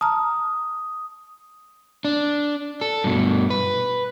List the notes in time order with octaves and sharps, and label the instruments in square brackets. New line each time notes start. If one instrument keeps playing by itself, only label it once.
[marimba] A5 A#5 F6 [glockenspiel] D#6
[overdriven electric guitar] D4
A4
G2 B2
B4